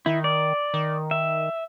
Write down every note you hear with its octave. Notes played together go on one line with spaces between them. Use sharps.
D#3 E4
D5
D#3
E5